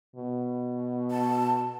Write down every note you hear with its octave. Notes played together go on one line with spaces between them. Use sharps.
B2
A5